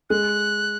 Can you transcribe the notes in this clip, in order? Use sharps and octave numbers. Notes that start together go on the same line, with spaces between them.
G#3 F#6